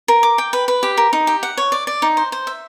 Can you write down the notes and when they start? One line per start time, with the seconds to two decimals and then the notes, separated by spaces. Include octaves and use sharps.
0.08 A#4
0.23 D6
0.38 G5
0.53 B4
0.68 B4
0.83 G4
0.97 A#4
1.13 D#4
1.27 G4
1.43 F#5
1.57 C#5
1.72 D5
1.87 D5
2.02 D#4
2.17 C5
2.32 C5
2.47 E5